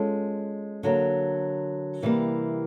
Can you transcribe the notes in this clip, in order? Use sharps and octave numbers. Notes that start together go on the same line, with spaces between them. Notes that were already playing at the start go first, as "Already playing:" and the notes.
Already playing: G#3 C#4 F4 A4
D3 F#3 A#3
C3 E3 G3 A#3